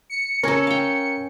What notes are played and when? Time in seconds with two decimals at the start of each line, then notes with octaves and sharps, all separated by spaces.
0.10 C#7
0.43 C#4 A4 A#4 G#5 A#5
0.67 F5 G5